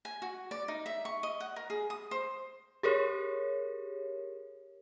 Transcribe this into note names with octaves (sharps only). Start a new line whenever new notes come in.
G#5
F#4
D5
D#4
E5
C#6
D#5
F#5
A#4
G#4
D#6
C5
G4 G#4 A#4 C#5